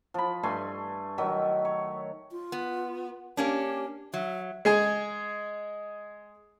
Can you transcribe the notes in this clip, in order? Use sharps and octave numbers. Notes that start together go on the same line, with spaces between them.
F3 B5
G2 A3 G#5 C6
D#3 F#3 E5
C#5
F4
B3
A#3 C#4 D4 G4
F#3 E5
G#3 G#4 G#5